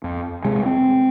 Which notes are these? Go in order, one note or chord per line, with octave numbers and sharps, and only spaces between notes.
F2
C3 G#3
C4